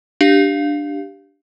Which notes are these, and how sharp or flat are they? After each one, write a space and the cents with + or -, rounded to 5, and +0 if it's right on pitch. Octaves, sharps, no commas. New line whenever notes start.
D4 +0 G4 -5 F5 +0